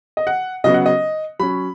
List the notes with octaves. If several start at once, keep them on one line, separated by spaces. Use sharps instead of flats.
D#5
F#5
C#3 F#3 B3 D#5
F#5
D#5
F#3 C#4 B5